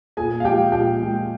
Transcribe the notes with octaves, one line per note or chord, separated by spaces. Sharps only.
A#2 G#4 G#5
F5
F3 G#3 G4 G5
A#2 G4 G5
F3 G#3